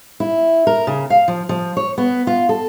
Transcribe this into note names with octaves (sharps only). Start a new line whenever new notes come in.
E4
A#4
C#3
F5
F3
F3
C#5
B3
F4
A4